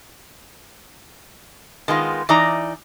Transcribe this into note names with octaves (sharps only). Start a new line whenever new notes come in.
D#3 G#3 B3 E4 F4
E3 D#4 D5 A#5